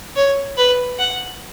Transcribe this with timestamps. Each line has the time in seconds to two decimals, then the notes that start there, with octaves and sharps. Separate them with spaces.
0.16 C#5
0.57 B4
0.99 F#5